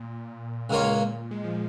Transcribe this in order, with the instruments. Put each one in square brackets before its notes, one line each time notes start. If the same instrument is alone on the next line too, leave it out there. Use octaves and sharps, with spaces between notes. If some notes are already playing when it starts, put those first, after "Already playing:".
Already playing: [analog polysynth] A#2
[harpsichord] C#2 C#3 A#3 F4 C#5
[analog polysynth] G#3
F3